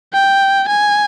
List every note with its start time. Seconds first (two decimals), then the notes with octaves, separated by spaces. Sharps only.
0.13 G5
0.69 G#5